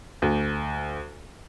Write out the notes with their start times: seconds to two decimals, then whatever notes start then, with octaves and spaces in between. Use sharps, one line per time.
0.22 D2